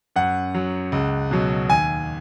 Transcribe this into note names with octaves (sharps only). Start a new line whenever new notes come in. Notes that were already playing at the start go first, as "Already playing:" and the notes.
F#2 F#5
F#3
C#2
B2 F#3
D#2 G#5